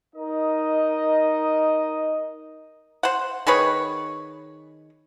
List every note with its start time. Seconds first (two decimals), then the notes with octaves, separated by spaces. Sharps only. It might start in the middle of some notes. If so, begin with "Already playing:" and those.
0.14 D#4 A#4 D#5
3.03 C5 F#5
3.47 D#3 G#4 B4 C#5